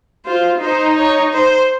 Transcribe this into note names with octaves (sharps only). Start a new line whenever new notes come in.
F4 C5
D#4 C5
C#5
C5